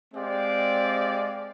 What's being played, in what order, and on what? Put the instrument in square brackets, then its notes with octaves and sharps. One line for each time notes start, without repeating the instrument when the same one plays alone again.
[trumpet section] G#3 C4 G4 D5 F5